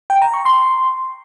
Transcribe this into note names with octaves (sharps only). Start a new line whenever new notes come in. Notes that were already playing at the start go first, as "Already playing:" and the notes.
G5
A#5
C#6
C6